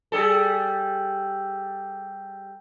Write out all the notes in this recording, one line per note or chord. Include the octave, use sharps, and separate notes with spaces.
G3 G#4 A4